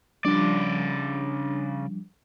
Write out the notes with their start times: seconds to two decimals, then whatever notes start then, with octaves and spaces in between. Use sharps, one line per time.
0.25 C#3 F3 G3 D4 D5